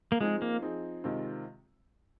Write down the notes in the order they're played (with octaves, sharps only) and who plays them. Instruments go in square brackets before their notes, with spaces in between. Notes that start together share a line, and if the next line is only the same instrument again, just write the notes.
[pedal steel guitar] A#3
[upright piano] F3 C4 D#4 G#4 [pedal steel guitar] G#3
[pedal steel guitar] A#3
[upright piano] F3 C4 D#4 G#4
C3 D#3 G#3 C4 F4